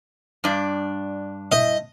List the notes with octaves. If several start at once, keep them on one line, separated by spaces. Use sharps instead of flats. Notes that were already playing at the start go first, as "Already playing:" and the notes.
G2 D4
E4 C5 D#5 E5